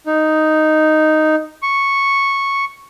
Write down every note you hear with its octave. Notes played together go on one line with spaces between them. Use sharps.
D#4
C#6